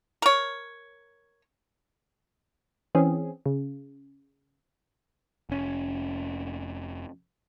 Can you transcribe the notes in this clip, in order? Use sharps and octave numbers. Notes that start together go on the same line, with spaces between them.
A#4 C#5
E3 C4 C#4 G#4
C#3
F1 C#4